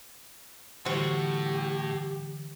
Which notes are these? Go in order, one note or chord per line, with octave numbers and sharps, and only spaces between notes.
A2 D3 E3 G3 C4 F#4 G4